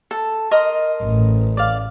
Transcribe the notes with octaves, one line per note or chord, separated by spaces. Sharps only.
A4
A#4 D#5 C6
A1
D5 F5